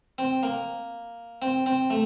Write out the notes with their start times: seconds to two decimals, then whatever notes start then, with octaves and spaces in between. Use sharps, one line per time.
0.18 C4
0.43 A#3
1.42 C4
1.66 C4
1.90 A3